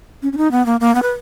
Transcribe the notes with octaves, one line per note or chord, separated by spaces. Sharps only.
C#4
C#4
D#4
B3
A#3
A#3
B3
B4